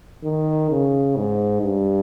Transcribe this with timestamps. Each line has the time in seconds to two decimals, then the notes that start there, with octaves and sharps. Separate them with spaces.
0.24 D#3
0.71 C#3
1.16 G#2
1.62 G2